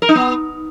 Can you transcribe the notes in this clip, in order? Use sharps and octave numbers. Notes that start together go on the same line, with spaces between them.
A#4
D#4
B3